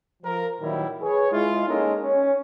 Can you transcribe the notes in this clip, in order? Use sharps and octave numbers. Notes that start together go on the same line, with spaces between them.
F3 A#4
A#2 D#3 E3 F#3 G3 E4
G#4 B4 C#5
G#3 E4 F4
G#3 A#3 C#4 D#4 A4 A#4
C#4